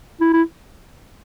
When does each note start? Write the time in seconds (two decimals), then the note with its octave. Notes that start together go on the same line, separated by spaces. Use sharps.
0.21 E4
0.33 E4